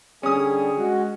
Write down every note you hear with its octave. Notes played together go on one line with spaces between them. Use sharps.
D3 G3 C#4 G#4 D#6
G#3 F#4